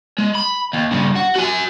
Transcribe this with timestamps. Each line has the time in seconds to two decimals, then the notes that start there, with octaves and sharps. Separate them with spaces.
0.18 G#3
0.35 B5
0.73 D#2
0.91 G2 C#3
1.16 F#4
1.36 F#4 G#5